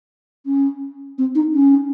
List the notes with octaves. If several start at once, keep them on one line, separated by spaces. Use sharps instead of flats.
C#4
C4
D#4
C#4